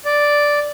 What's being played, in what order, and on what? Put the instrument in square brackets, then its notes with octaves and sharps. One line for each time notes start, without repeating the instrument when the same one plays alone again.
[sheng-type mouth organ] D5